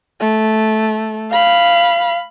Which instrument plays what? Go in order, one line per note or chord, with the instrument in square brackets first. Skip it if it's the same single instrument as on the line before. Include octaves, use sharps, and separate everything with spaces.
[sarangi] A3
[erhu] F5 [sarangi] B5